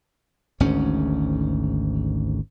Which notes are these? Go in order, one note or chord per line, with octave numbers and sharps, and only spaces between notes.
G#1 D2 G#2 C#4